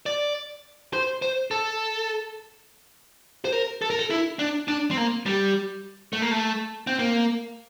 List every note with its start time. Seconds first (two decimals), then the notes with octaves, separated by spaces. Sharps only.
0.06 D5
0.93 C5
1.22 C5
1.51 A4
3.45 C5
3.52 A#4
3.82 A4
3.90 A#4
3.99 A4
4.10 E4
4.39 D4
4.68 D4
4.91 C4
4.97 A#3
5.26 G3
6.13 A3
6.22 A#3
6.31 A3
6.87 C4
6.99 A#3